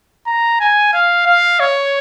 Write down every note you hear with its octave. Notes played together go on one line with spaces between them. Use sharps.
A#5
G#5
F5
F5
C#5